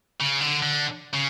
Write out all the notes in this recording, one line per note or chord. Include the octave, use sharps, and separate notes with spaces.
C#3
D3
D3
C#3